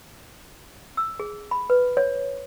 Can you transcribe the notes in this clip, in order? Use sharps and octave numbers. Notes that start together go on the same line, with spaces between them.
E6
G#4
B5
B4
C#5